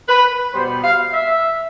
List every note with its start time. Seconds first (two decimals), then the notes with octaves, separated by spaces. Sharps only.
0.09 B4
0.54 B2 G3 B3 C5
0.84 F5
1.14 E5